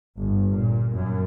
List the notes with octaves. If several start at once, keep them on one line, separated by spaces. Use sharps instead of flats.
G1
A#2
F#2